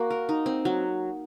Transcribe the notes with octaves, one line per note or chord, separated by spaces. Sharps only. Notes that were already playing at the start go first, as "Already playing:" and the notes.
Already playing: A#3 F#4
A#4
D#4
C4
F#3